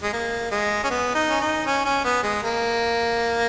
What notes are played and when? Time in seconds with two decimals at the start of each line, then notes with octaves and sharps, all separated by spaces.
0.03 G#3
0.13 A#3
0.51 G#3
0.84 C#4
0.90 B3
1.15 D#4
1.30 C#4
1.41 D#4
1.66 C#4
1.85 C#4
2.04 B3
2.23 G#3
2.43 A#3